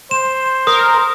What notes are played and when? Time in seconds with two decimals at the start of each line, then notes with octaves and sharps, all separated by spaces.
0.11 C5 E7
0.67 A#4 D#6